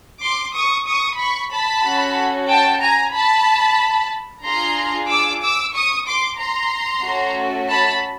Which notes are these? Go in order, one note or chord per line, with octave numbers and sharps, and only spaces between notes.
C6 D6
C#6 D#6
C#6 D#6
B5 C#6
A5 B5
C#4 F#4 A4
G5 A5
G#5 A#5
A5 B5
D4 F4 G#4 A#5 C6
D6 E6
D6 E6
C#6 D#6
C6 D6
A#5 C6
A3 C#4 F#4 A4
A5 B5